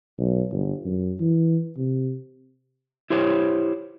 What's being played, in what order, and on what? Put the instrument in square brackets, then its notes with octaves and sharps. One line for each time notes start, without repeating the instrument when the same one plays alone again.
[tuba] B1
G1
F#2
E3
C3
[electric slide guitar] E4 G4 C5 C#5